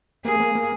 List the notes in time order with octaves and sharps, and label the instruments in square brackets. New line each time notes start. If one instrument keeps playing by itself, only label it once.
[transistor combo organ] A#3 [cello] G#4
[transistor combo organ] A#3
A#3